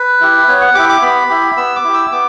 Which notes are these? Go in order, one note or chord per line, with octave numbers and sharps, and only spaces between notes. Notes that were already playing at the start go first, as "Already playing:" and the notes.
Already playing: B4
E4 G4
B3 C#5
F#5
E4 G4 D6
D6
B3 B5
E4 G4
B3 E6
D6
E4 G4
E6
B3 D6